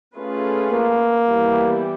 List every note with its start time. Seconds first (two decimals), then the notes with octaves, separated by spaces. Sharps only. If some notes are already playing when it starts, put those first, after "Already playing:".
0.16 A3 C#4 F4 G#4 B4
0.72 A#3
1.27 E3 G3 B3 E4 G4